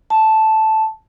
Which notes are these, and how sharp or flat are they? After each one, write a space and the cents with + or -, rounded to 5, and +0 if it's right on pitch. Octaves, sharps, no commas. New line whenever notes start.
A5 -5